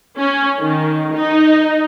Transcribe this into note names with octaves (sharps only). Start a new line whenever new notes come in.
C#4
D#3
D#4